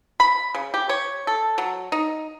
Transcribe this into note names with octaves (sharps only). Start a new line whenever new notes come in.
B5
C#3
G4
C#5
A4
F#3
D#4